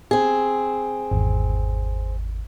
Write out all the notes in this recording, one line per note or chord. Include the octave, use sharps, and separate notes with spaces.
C4 G#4
G#1 E2